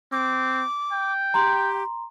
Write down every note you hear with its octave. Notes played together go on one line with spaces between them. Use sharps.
C4 D6
G5
G4 A#5 C6